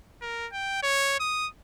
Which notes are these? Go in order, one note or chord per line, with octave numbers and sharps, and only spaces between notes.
A#4
G5
C#5
D#6